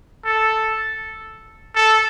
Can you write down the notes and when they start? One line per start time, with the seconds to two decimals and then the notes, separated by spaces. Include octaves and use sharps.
0.25 A4
1.75 A4